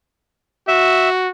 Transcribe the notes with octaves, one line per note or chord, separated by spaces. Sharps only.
F#4 E5